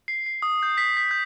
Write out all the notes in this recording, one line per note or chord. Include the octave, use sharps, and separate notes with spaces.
C7
C7
D#6
G6
B6
B6
G6